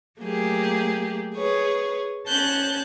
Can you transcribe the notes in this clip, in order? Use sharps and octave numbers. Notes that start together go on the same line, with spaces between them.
F#3 A3 A#3 G4 G#4
G#4 B4 C#5
C#4 A5 F#6 G6